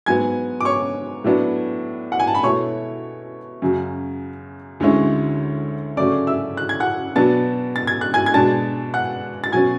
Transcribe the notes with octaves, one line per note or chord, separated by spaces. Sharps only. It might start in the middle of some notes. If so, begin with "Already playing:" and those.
G#2 F#3 B3 G#5 G#6
D6
C#5 C#6
A2 F#3 B3 D4
F#5
G#5
A5
B5
B2 A3 E4 C#5 C#6
F#2 C#3 F#3
D2 D3 G#3 C#4 E4
C#3 F#3 A3 C#4 D5 D6
E5 E6
F#6
G#6
F#5 F#6
B2 F#3 B3 D4 A5 A6
A6
G#6
F#6
G#5 G#6
G#6
B2 G#3 D4 A5 A6
F#5 F#6
A6
B2 F#3 C#4 G#5 G#6